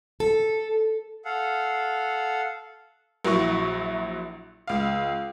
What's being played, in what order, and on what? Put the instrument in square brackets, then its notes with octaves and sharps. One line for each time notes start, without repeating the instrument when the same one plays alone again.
[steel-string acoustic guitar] A4
[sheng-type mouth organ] A4 F5 F#5
[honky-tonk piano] A#1 F#3 E4 C#6
C#2 F5